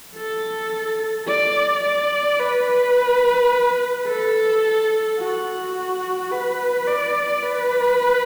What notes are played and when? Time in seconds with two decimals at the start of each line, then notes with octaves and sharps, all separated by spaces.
0.15 A4
1.28 D5
1.84 D5
2.40 B4
4.07 A4
5.19 F#4
6.31 B4
6.87 D5
7.43 B4